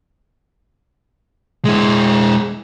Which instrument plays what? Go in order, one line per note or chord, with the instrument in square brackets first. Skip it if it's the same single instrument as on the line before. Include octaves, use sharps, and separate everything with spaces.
[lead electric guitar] G#3 E4